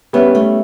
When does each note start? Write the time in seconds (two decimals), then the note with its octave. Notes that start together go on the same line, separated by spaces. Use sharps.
0.13 G3 B3 C#4 E4
0.35 A3